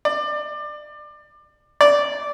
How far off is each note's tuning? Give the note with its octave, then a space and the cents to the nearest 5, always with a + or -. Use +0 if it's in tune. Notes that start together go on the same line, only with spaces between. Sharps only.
D5 +25
D5 -10